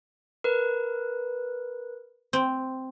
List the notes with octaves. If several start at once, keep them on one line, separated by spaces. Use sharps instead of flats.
A#4 B4
C4